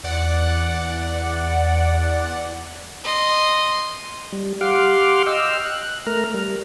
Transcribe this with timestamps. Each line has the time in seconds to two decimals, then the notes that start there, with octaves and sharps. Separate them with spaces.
0.04 E2 D5 F#5
3.04 D#5 C6
4.33 G3
4.61 G4 F5 F#5 C6 D6 F6
5.26 D#5 G5 E6 F6
5.64 F#6
6.06 A3 A#4 A#5 F6
6.34 G3